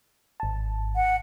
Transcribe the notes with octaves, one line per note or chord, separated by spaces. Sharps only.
G#1 A5
F#5